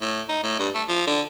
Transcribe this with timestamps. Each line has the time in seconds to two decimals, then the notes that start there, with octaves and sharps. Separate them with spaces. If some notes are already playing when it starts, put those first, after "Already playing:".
0.01 A2
0.29 D#4
0.43 A2
0.59 G2
0.75 A3
0.89 F3
1.07 D3